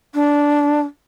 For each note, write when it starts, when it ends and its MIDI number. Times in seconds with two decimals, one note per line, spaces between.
0.15 0.81 62